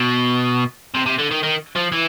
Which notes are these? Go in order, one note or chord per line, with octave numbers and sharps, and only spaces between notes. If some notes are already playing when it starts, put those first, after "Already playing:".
Already playing: B2
C3
C3
D3
D#3
D#3
F3
E3